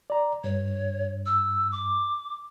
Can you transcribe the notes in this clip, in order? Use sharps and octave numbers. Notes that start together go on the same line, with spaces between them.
D5 A#5
G2 C#5
E6
D6